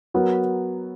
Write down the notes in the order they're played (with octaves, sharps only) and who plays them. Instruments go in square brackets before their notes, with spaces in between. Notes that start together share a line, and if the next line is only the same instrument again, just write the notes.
[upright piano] F#3 B3 F#4 A#4